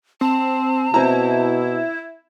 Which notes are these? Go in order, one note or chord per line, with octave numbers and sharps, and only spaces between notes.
C4 A5
B2 C4 E4 A#5